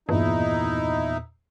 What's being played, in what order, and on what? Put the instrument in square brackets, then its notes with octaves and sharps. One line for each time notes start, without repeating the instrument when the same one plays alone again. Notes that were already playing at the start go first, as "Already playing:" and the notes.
[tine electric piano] E2 A#2 [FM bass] G2 [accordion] D#4 E4